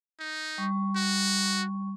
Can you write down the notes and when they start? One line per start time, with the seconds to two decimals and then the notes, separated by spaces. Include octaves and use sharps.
0.20 D#4
0.58 G3 C#6
0.96 F#4